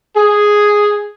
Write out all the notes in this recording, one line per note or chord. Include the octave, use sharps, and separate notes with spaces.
G#4